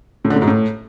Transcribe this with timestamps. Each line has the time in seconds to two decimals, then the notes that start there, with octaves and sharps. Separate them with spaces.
0.25 A2
0.30 D3
0.36 A2
0.42 G#2
0.47 A2